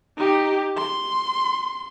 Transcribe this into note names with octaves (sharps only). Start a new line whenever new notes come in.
D#4 G4
C6